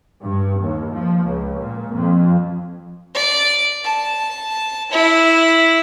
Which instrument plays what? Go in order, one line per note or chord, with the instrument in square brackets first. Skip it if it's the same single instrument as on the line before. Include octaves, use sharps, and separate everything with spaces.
[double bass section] G2
D#2
F3
C#2
A#2
F2
[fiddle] D5
A5
E4